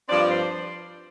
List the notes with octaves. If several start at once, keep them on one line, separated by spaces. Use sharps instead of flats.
G2 F3 C4 D5
C5